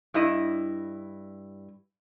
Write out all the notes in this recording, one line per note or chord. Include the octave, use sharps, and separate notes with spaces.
G2 E4 D#5